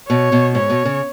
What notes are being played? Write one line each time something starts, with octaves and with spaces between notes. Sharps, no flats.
B2 C#5
B2
G#2 C#5
B2
C#3